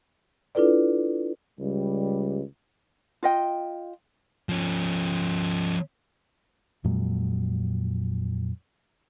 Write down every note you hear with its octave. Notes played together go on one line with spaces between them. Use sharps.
D4 E4 F4 A4 B4 D5
C#2 G3
F4 D#5 G5
F3 C#4
F2 A#2 F#3 G#3